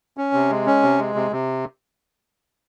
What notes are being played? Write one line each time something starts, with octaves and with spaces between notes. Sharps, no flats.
C#4
C3
G#3
C#4
C3
G#3
C3
C3